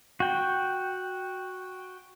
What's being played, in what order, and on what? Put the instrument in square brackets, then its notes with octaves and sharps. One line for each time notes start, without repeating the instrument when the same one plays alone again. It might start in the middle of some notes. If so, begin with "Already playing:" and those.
[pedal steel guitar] F#4 G5